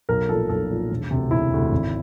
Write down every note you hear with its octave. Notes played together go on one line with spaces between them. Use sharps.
B1 A#4
A#2 F3 A4
B1 A4
A#2 F3
E1
D2 C3
E1 E4
D2 C3
G#1